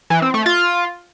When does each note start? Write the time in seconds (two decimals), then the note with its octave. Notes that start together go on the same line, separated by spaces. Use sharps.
0.10 E3
0.22 C4
0.34 A3
0.46 F4